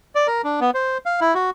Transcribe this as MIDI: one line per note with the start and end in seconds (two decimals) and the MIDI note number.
0.15 0.27 74
0.27 0.42 70
0.44 0.60 62
0.60 0.71 59
0.74 0.98 72
1.05 1.20 77
1.21 1.34 64
1.35 1.50 66